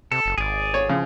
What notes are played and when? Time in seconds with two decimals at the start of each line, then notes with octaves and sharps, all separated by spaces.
0.12 C3 A4
0.26 F#1
0.38 G#1 G#4 D5
0.74 C#5
0.89 C#3 F3